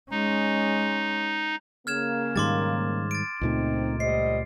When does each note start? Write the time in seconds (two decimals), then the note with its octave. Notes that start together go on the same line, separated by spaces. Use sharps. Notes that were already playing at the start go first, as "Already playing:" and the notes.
0.11 G#3 C#4 D#4
1.87 C#3 A#3 F6 G#6 E7
2.36 G#2 D#3 G3 C6 D6 A6
3.11 A6 D7
3.41 C#2 A#2 A3 C4 D#4
4.00 G3 C5 D#5 C7